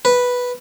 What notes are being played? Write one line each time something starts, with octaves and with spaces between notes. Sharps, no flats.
B4